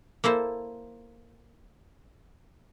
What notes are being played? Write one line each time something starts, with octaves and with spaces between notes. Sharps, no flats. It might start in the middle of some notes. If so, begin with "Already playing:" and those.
A#3 E4 A4 C5